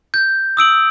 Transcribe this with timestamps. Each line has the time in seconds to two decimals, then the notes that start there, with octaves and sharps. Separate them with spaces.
0.14 G6
0.57 D#6 E6 D7 F#7